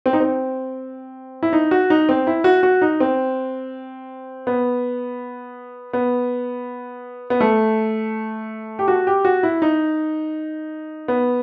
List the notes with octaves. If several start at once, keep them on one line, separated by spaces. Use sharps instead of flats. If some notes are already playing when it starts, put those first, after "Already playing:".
C4
D#4
C4
E4
D#4
F#4
D#4
C4
E4
F#4
F#4
D#4
C4
B3
B3
B3
A3
G4
F#4
G4
F#4
E4
D#4
B3